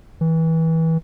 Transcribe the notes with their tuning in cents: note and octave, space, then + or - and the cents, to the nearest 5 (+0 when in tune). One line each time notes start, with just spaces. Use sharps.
E3 -25